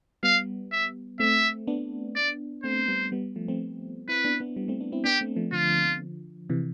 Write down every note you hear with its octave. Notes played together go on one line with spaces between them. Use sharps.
G3 B3 F5
E5
A3 C4 E5
B3 D4
D5
A3 C4 C5
G3 B3
G3 B3
F3 A3
A3 C4
C4 E4 B4
B3 D4
B3 D4
G3 B3
A3 C4
B3 D4
C4 E4
B3 D4 G4
A3 C4
F3 A3
D3 F3 F4
C3 E3